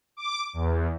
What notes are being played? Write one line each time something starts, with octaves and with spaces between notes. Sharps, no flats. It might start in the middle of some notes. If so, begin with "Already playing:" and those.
D6
E2